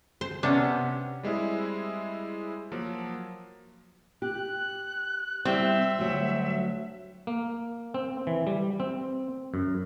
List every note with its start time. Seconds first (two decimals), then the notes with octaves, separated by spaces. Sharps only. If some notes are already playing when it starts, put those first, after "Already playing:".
0.21 C5
0.43 C3 B3 C#4 D4
1.23 G3 G#3 C4 E4 G#4
2.72 F3 F#3 A#3
4.22 G4 F#6
5.45 G3 C4 E4 G4 E5
5.99 D2 F#3 G3
7.27 A#3
7.94 C4
8.27 E3
8.47 G3
8.80 C4
9.54 F#2